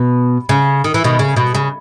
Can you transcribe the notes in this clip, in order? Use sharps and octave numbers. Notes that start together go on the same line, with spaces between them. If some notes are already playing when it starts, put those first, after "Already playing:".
Already playing: B2
C#3
D#3
E3
B2 D#3
C#3
B2
C#3